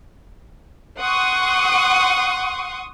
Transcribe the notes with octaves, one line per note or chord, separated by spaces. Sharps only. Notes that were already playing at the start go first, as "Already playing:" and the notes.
F#5 C6 C#6 D#6